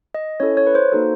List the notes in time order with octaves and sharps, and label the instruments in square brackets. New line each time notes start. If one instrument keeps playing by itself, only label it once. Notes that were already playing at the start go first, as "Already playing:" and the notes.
[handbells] D#5
C#4 E4 A4 C#5
C#5
B4
C5
A#3 D#4 F#4 A4